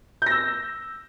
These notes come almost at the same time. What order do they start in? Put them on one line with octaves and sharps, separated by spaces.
G6 A#6 E6